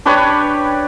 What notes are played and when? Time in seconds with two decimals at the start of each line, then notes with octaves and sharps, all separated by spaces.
0.05 D4 G4 B4 C#5